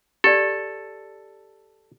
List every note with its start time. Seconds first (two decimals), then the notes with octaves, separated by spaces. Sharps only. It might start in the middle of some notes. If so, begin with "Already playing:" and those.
0.24 G4 A4 D5